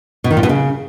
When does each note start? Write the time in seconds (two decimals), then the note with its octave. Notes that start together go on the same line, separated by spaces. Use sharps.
0.24 B2
0.31 D#3
0.37 A#2
0.43 B2
0.49 C#3